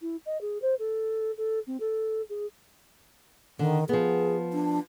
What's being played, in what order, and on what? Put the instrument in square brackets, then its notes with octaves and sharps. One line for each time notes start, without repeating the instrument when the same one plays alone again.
[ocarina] E4
D#5
G#4
C5
A4
A4
C4
A4
G#4
[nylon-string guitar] D3 [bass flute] D#3
[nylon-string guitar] F3 B3 [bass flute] G#4
[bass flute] D4